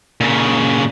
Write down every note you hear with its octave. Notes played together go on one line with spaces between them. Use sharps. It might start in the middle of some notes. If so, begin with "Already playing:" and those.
A#2 C#3